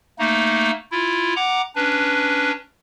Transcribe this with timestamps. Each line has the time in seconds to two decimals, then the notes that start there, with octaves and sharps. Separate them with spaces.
0.19 A3 A#3 D#4
0.91 E4 F4
1.36 F#5 A#5 D6
1.76 C#4 D4 B4